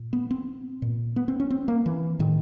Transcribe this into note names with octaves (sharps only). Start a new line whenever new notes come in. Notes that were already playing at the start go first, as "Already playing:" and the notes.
Already playing: A#2
B3
C4
A#2
B3
C4
C#4
C4
A#3
E3
A2 D#3